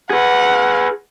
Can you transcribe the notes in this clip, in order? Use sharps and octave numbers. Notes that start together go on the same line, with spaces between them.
G#4 B4 F#5